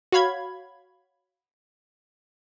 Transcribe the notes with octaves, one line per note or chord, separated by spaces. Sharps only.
F#4 C#5 F5 B5 G#6